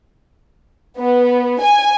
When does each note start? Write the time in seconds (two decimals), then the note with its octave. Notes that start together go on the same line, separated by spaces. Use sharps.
0.99 B3
1.62 G#5